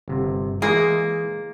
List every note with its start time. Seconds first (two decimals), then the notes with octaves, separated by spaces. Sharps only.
0.08 G1 C3
0.62 E3 G#3 A#3 G#4